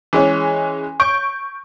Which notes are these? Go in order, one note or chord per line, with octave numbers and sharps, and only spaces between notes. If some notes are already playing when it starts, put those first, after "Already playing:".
E3 G#3 C#4
C#6 G6 D7